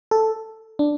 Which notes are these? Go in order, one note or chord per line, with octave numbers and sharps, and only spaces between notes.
A4
D4